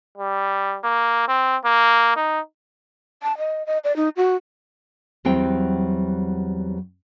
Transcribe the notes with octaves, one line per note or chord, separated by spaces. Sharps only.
G3
A#3
C4
A#3
D#4
A5
D#5
D#5
D5
D#4
F#4
E2 F#3 G3 C4 E4 G5